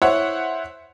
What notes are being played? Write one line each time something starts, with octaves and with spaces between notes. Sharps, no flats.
E4 C5 C#5 F#5